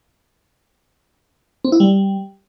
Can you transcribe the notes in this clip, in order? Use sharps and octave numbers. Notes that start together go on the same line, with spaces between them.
C4
E4
G3